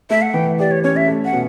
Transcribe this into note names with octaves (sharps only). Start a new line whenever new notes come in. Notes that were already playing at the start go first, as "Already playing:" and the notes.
A3 E5
F#5
E3 G5
G4 D5
C#5
C#4 C#5
E5
A3
F#5
B2